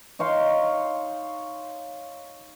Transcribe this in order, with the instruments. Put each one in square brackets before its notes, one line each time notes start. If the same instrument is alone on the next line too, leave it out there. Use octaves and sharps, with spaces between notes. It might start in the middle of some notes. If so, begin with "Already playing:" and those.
[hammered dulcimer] D#4 C#5 F5 C6